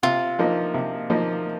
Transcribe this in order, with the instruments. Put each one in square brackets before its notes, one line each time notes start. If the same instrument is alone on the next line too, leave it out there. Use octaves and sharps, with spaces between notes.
[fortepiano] C3 [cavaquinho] F4
[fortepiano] F3 A#3 D#4
C3
F3 A#3 D#4